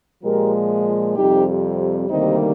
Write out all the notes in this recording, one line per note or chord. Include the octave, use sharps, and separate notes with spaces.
A#2 F3 G#3 G4 A#4
F2 C3 G3 D#4 G4
D2 C3 D#3 G3 A#3 C4 D#4